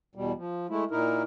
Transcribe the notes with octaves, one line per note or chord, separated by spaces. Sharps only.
E2 B2 G3
F3
G#3 A3 E4
A#2 D#4 E4 A#4